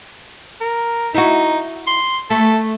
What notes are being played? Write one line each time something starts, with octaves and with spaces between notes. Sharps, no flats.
A#4
D#4 E4 F#4
C6
A3 A4